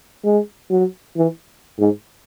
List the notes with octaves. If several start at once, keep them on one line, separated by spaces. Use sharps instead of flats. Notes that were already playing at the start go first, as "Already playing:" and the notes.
G#3
F#3
E3
G#2